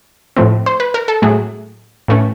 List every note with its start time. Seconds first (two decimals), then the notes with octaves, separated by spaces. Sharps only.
0.37 A2 F3 A3 C4
0.66 C5
0.80 B4
0.94 A#4
1.08 A4
1.22 A2 F#3 A3 G#4
2.08 A2 E3 A3 C#4